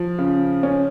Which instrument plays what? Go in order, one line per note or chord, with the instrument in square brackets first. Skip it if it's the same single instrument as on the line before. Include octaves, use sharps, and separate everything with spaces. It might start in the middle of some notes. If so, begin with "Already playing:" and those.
Already playing: [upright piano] F3
C#3
C#4